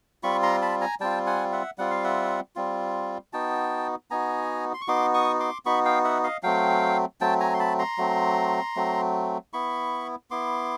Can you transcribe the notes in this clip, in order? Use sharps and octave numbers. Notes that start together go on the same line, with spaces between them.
G3 C4 F4 B5 C#6
A#5 C6
A5 B5
G#5 A#5
G3 C4 F4 G5 A5
F#5 G#5
E5 F#5
G3 C4 F4 F#5
F5
E5 F#5
G3 C4 F4
B3 D#4 F#4 G5 A5
B3 D#4 F#4 G#5 A#5
C6
C#6
B3 D#4 F#4 C6 D6
C#6 D#6
C6 D6
B3 D#4 F#4 B5 C#6
F5 G5
E5 F#5
D#5 F5
F#3 A3 C4 F5 G5
F#3 A3 C4 G5 A5
G#5 A#5
C6
A5 B5
A#5 C6
F#3 A3 C4
F#3 A3 C4
B3 E4 B5 C#6
B3 E4 C6 D6